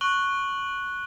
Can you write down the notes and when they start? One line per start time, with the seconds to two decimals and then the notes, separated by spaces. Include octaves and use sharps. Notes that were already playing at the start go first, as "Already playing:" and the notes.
0.01 C#6 F#6 F#7 G7